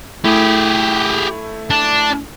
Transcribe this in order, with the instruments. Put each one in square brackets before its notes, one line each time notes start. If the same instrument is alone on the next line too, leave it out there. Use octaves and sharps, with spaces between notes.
[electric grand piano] A3 E4 [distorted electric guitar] G4 G#4
[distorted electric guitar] D4